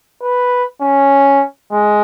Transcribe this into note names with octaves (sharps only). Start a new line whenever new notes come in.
B4
C#4
G#3